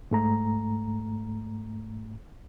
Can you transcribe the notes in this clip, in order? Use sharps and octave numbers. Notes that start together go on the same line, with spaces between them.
G#2 A3 A#5